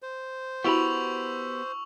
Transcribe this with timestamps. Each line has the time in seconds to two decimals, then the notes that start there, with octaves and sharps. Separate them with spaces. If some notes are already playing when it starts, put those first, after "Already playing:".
0.02 C5
0.64 B3 E4 F#4 G4 B5 C#6 E6 F7